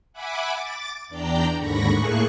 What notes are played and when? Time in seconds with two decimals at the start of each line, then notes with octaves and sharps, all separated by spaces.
0.13 E5 F#5 G#5 B5 D6
0.54 D6 A6
1.09 E2 D4 D5 G5 A#5 G6
1.56 D#2 G#2 D3 B5 C#6 A#6
1.90 A2 A3 A#3 G#4 C#6 F#6